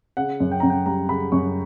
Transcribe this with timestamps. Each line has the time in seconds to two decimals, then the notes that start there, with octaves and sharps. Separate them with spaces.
0.17 C#3 F#5
0.40 F#2
0.51 G5
0.60 F#2 A#5
0.70 G5
0.86 G3 A#5
1.09 C#3 B5
1.32 F#2 C#6